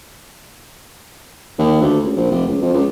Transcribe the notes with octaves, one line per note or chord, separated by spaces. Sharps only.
D#2
D2
C#2
A#1
F1
C#2
F2
C#2